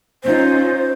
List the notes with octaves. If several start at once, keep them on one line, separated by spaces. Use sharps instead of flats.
C#4 D#4 F4 C5